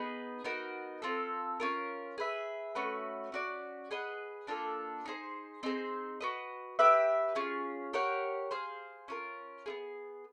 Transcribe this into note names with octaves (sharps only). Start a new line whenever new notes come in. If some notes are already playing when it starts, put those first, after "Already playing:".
Already playing: B3 D#4 G#4 B4
B3 D#4 F#4 A#4
C4 F4 A4
C#4 F4 A#4
G#4 B4 E5
A3 C#4 F#4 B4
C#4 F#4 A#4 D5
G#4 B4 D#5 F#5
A#3 D4 F4 A4
D#4 G#4 C5
C4 D#4 G#4 C5
F#4 B4 D#5
G4 B4 E5 G5
C#4 F4 G#4
G4 A#4 C#5 F#5
G#4 C5 F5
C#4 F4 A#4
B3 E4 G#4